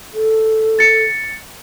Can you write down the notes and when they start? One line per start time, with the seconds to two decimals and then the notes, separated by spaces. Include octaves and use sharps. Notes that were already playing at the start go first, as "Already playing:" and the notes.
0.14 A4
0.79 A6 C#7